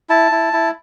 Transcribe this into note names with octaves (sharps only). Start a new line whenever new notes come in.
E4 A5
E4
E4